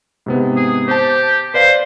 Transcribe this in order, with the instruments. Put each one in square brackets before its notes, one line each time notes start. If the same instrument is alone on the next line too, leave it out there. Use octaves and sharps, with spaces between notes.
[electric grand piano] G#2 C3 B3
[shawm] G#4
[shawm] G4 [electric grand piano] C5 A5
[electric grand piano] B4 D5 F5 [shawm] C5